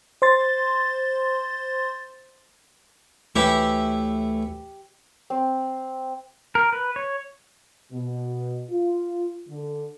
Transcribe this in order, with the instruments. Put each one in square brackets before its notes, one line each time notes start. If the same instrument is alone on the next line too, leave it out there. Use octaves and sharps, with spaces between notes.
[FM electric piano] C5 C6 A6
[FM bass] D2 [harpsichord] E3 E4 [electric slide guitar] A3 C#5 [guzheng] G4
[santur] C4
[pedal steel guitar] A#4
B4
C#5
[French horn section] B2
F4
D3